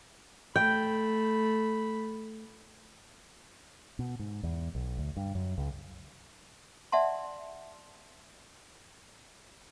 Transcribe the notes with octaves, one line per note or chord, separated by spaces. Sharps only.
A3 G5 B5
B2
G#2
E2
B1
D2
G2
F#2
C#2
D5 E5 F#5 A5 C6